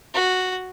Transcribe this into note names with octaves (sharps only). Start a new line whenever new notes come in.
F#4